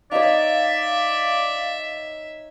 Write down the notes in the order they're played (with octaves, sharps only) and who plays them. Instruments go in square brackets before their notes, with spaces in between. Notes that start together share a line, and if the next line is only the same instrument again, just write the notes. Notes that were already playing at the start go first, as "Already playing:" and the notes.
[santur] D#4 C#5 [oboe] D5 [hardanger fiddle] E5 [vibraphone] F5